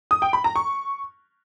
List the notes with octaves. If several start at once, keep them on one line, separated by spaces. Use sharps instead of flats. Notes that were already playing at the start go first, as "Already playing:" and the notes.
D#6
G5
B5
A#5
C#6